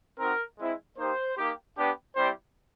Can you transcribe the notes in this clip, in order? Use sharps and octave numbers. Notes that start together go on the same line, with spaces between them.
C4 D#4 F#4 A#4
G#3 C4 E4
A#3 D#4 G4 C5
A#3 D#4 G4
B3 D4 G4
G3 C4 E4 G4 C5